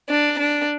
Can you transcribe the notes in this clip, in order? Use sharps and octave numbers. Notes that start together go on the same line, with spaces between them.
D4
D4